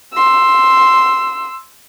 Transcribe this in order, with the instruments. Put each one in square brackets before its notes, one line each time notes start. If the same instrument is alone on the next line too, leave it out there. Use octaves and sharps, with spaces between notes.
[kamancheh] C6 E6